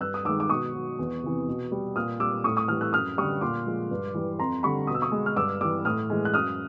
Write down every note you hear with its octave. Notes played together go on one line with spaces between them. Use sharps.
G2 E6 F#6
D#6
D#3 G#3 D6 E6
D6
B2 C#6 D#6
F#3
E2
C3 E3
B2
G3
A#2 D#6 F6
G3 D6 E6
A2 C#6 D#6
C#6 D#6
E3 G3 D#6 F6
E6 F#6
F#2 D#6 F6
D3 G3 C#6 D#6
A#2 C6 D6
F3 G#3
G2
E3 G3
F2 A#5 C6
D3 G3 B5 C#6
B2 D#6
E6
C#6 D#6
G#3
F6
G2 D6 E6
E3 G3 D6 E6
A2 D#6 F6
E3 G#3
F#6
F#2 D#6 F6